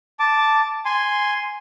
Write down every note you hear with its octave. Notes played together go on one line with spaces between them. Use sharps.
A5 D6
G#5 C6